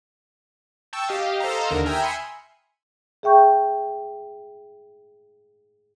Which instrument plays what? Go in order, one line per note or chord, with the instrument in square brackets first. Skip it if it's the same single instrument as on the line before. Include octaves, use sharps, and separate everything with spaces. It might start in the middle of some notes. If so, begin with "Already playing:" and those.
[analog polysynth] G5 A5 C#6 E6
G4 D#5 F5
A4 C5 D#5 F5 A#5
D#2 D3 A#4
E5 G5 G#5 A#5 D#6 F6
E5 G#5 B5 C6 C#7 D#7
[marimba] G#4 E5 G5 C#6 G6